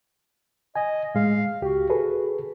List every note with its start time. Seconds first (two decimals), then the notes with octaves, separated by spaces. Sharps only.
0.76 D#5 G#5
1.15 A2 G#3 F5
1.62 C#2 F#4 G4
1.90 G#4 A4 B4